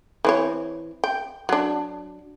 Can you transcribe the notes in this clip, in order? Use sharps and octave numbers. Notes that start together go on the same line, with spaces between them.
E3 C4 C#5
G5
F#3 D4